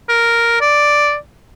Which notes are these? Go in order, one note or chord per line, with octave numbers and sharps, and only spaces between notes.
A#4
D5